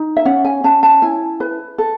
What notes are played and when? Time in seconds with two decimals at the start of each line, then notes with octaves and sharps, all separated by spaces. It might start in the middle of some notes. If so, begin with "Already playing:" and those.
Already playing: D#4
0.17 E5
0.25 C#4 F#5
0.45 G#5
0.64 C#4 A5
0.83 A5
1.02 E4 G#5
1.40 B4
1.78 A4